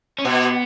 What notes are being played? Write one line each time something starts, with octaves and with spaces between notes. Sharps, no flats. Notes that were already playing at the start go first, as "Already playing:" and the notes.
C#4
B2 B3